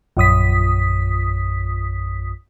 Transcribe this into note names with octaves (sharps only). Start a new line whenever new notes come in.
A#1 F#2 D#6 B6